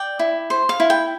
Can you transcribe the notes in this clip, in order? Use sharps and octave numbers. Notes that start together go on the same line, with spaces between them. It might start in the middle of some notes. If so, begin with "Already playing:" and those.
Already playing: D5 G5
E4
C5
F5
E4
G5